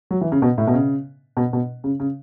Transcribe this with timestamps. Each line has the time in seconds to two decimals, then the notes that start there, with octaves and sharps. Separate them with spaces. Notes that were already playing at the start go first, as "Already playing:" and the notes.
0.11 F#3
0.21 E3
0.32 C#3
0.42 B2
0.58 A2
0.67 B2
0.74 C#3
1.37 B2
1.53 B2
1.84 C#3
2.00 C#3